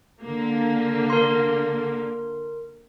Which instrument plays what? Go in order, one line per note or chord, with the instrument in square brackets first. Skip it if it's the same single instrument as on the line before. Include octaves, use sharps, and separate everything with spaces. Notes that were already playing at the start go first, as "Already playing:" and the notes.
[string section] D3 A#3
[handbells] A#4 C6